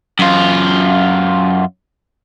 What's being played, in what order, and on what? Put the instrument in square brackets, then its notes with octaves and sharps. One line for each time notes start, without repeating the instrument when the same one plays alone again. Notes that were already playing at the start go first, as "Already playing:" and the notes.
[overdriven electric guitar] F#2 F4